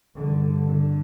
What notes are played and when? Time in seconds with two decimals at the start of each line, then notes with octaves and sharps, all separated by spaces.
0.17 G2 D3
0.67 D3